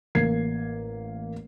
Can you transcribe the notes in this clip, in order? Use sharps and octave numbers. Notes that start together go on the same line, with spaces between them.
A1 A#3 G#6 C7